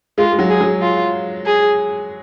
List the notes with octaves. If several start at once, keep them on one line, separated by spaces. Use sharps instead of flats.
G#3 F4
G#3
F#3
G#4
F#3
F4
G#4